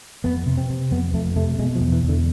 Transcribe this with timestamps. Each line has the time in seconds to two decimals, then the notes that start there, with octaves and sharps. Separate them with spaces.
0.24 F2 B3
0.46 C3
0.57 C4
0.70 C3
0.91 F2 B3
1.14 F2 A3
1.36 C3 A3
1.59 B2 G#3
1.76 F3
1.81 E2
1.92 E3
2.04 E2
2.09 D3